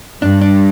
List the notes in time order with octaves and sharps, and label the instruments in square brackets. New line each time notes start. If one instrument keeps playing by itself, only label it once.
[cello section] G2 [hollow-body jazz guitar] D4
[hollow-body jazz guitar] D4